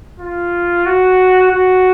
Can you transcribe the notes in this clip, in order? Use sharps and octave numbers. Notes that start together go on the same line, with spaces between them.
F4
F#4
F#4